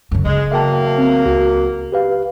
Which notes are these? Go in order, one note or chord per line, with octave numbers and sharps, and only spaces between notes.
F#2 C#3
C#3 G#3
E2 F#3 A#3 E5 G5 A5
C4
C#2 F#4
G4 B4 F5